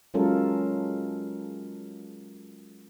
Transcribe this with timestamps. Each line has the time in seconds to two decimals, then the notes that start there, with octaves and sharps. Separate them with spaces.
0.14 F#3 G#3 C#4 F4 A4 A#4